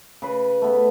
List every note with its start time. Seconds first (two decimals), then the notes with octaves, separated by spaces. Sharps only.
0.22 C#3 B4
0.62 A3 B3